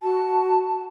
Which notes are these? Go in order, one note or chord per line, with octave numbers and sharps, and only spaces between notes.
F#4 A5